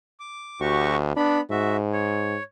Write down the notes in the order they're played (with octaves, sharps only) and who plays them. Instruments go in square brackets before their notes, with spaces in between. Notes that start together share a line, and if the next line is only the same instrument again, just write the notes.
[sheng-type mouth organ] D6
[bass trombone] D2 [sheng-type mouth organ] F#4 G4 C#6
[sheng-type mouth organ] B3 B5 [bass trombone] D4
[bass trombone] G#2 [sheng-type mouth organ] F#4 E5
[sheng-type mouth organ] C#5